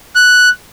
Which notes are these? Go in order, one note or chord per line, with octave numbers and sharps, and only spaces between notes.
F#6